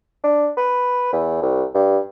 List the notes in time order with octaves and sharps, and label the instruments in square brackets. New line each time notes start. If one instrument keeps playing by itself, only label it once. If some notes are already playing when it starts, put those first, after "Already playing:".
[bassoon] D4
B4
E2
C2
G2